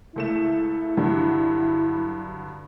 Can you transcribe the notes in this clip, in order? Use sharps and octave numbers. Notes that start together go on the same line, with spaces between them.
C#2 A3 E4 E7
G2 D3 F#3